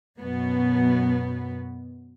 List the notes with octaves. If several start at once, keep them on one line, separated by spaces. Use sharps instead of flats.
F#2 B2 B3